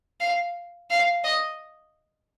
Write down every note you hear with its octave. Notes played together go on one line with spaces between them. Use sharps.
F5
F5
D#5